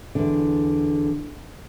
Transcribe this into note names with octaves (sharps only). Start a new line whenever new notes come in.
E2 D3